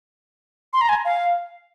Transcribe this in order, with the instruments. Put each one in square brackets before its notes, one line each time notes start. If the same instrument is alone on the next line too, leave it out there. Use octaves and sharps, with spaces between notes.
[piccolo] C6
A#5
G#5
F5